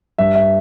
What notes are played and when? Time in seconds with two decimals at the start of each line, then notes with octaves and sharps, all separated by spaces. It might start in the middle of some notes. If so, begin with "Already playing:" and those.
0.18 G2 E5
0.35 E5